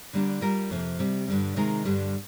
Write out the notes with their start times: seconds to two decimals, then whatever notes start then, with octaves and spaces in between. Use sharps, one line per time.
0.13 D3 G3 A#3 D4
0.41 G3 D4 F4 A#4
0.70 F2 C3 F3 A#3
0.99 C3 G3 C4
1.28 G2 D3 G3
1.56 C3 D#3 G#3 D#4 A#4
1.85 G2 D3 G3